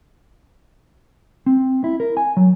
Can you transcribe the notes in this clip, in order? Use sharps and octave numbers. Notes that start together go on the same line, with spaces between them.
C4
E4
A#4
G#5
F#3